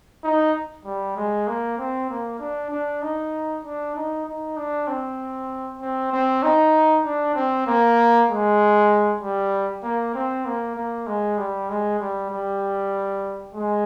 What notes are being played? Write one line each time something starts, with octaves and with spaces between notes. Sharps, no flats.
D#4
G3
G#3
A#3
C4
A#3
D4
D4
D#4
D4
D#4
D#4
D4
C4
C4
C4
D#4
D4
C4
A#3
G#3
G3
A#3
C4
A#3
A#3
G#3
G3
G#3
G3
G3
G#3